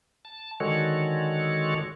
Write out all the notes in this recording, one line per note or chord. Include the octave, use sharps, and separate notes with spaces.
A5
D3 D#3 G#3 F#4 A4 C#5